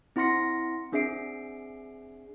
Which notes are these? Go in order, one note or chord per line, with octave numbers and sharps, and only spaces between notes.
C4 E4 F#5 C6 A#6 C#7
C4 D4 G#4 E5 C7 D7